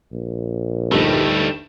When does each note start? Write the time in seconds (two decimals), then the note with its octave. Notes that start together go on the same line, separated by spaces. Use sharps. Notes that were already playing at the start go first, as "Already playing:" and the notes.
0.13 A#1
0.92 D2 G2 G3 A3 D#4